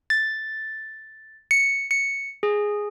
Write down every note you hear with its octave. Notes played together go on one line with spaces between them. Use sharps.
A6
C#7
C#7
G#4